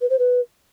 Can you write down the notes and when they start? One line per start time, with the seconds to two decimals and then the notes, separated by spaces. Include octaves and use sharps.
0.01 B4
0.10 C5
0.19 B4